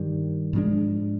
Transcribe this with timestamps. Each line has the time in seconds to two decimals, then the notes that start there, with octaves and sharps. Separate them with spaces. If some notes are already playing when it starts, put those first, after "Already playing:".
Already playing: G2 D#3 G3
0.53 G#2 F3 G#3 D4